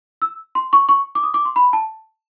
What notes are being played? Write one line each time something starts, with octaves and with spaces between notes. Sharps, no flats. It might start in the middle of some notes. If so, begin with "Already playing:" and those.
E6
C6
C#6
C#6
D6
D#6
D6
C6
B5
A5